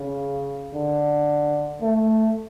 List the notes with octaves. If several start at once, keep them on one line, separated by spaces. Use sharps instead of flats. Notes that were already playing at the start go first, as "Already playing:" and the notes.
Already playing: C#3
D3
A3